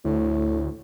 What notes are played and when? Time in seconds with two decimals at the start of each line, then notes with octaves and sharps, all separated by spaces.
0.05 D2 A2